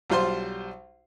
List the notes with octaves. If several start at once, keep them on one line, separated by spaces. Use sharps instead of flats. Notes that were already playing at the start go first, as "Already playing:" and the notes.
B1 G3 F4 C5 C6